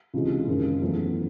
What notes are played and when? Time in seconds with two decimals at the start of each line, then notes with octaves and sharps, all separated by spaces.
0.14 C#2 C3 E3 G#3 D#4
0.47 F#1 F#2 D#3 G#3
0.81 E2 C#3 F#3 A3